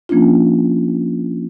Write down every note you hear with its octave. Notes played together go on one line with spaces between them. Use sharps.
F3 A#3 C#4 D4 F4